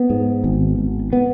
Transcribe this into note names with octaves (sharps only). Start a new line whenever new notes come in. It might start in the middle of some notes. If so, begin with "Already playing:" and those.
Already playing: B3
G#2
G#1
G#1
B3